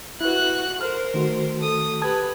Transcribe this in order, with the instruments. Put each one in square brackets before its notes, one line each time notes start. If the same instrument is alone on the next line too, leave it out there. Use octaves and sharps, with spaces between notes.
[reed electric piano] E4 B4 [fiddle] F#4 F#6
[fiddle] A#4 C5 [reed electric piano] F6
[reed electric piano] D#3 A3 F#4
[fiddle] A4 D#6
[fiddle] G4 B4 [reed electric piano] A5 D#6 G#6